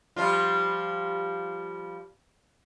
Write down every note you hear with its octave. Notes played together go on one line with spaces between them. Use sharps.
F3 G3 F4